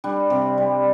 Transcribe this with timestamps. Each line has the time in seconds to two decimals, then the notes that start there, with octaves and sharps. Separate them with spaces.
0.04 G3 D4
0.30 C3
0.58 G3